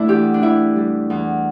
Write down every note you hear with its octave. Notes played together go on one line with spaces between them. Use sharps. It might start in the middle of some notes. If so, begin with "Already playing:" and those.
Already playing: A3 D4 E4
E2 G4
D4
E3 E4
G3
E2